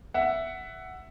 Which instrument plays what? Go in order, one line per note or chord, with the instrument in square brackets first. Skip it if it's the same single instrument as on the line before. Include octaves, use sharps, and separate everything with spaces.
[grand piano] E5 F#5